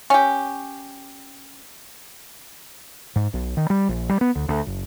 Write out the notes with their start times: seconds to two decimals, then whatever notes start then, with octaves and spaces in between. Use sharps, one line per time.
0.10 C#4 G4
3.16 G#2
3.34 B1
3.57 D#3
3.70 G3
3.89 A#1
4.09 G3
4.21 B3
4.36 D2
4.49 D2
4.67 F#1